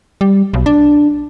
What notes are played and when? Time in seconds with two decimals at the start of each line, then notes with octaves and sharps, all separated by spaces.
0.21 G3
0.53 B1
0.66 D4